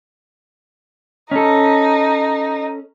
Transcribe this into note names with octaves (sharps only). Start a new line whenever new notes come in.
C#4 D#4 A4